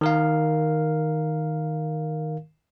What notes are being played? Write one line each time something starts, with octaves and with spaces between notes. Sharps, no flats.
D#3 A#4 F5